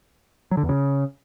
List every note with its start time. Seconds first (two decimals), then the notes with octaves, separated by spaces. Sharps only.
0.51 F#3
0.57 D3
0.63 E2
0.69 C#3